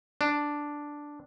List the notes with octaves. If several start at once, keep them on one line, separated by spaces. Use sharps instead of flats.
D4